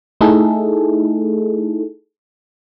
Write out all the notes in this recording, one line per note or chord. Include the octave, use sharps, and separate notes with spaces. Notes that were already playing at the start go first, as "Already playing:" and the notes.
A3 D#4 E4 G#4 A4